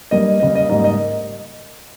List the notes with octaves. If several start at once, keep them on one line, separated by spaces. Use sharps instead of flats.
G2 G3 A#3 D#5
C#3 G3 A#3 D#5
D#5
G#2 G3 A#3 D#5
D#5